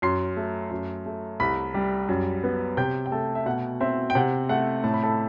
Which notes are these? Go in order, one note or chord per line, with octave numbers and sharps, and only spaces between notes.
F#2 C6 C7
A3
F#2
A3
C2 B5 B6
G3
F#2
B3
C3 G5 G6
G5
A3 A4 A5
E5
B2 F#5
C4 E5
G5
C3 F#5
A3 F#5
A2 A5
B5
A4 A5